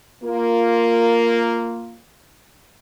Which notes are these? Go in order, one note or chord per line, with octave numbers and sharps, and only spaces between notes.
A#3 F4